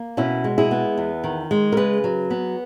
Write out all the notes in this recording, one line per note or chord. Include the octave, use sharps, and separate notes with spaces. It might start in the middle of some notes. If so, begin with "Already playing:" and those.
Already playing: A#3
B2 C#4 E4
G#3
E4 G#4
B3
E2
D#3
G#3
A#4
C#3 G#4 B4
F#3
B3